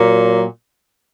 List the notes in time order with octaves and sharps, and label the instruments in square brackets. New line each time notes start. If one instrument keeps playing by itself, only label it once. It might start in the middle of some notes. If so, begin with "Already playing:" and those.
Already playing: [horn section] A#2 F#3